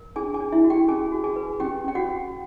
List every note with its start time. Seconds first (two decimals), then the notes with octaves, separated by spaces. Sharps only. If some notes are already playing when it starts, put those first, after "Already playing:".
Already playing: A#4
0.16 D4 G#4 G#5
0.34 G#4 G#5
0.40 D4
0.52 E4 E5
0.64 F#4
0.70 G4 G5
0.88 C#4 G#4 G#5
1.12 F#4
1.24 G#4 G#5
1.36 B4
1.60 C#4 G4 G5
1.84 C#4 G5
1.95 F#4 F#5
2.07 F#4